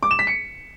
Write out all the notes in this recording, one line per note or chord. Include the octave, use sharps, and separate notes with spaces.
D6
E7
B6
C#7